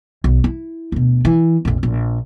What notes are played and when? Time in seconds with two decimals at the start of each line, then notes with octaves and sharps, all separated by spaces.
0.24 B1
0.44 E4
0.92 D2 B2
1.25 E3
1.65 A#1 F2
1.83 A#1